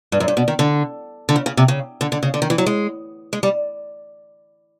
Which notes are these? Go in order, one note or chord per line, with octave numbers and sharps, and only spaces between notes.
G2
F#2
G2
B2
D#3
D3
D3
C#3
C#3
C3
C#3
D3
D3
C#3
D3
D#3
E3
F#3
G#3
G#3
G3